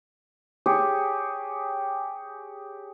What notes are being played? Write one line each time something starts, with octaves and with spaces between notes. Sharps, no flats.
G4 G#4 C#5 F5